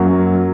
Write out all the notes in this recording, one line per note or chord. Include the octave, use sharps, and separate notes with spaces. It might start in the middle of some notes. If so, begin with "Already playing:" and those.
Already playing: F#2 F#3 A#3